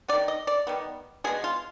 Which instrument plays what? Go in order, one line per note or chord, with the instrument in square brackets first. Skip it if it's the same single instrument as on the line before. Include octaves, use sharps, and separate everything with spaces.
[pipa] B3 D5
D#3
D#5
D5
D#3 G3 B3
B2 G#3 B3 G#4
F4